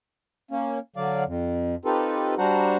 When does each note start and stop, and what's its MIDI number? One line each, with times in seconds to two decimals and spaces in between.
0.51 0.79 58
0.51 0.79 61
0.96 1.24 50
0.96 1.24 54
0.96 1.24 74
0.96 1.24 77
1.27 1.75 41
1.85 2.35 60
1.85 2.35 63
1.85 2.35 65
1.85 2.35 67
1.85 2.35 69
1.85 2.35 71
2.38 2.77 55
2.38 2.77 62
2.38 2.77 66
2.38 2.77 72
2.38 2.77 78
2.38 2.77 82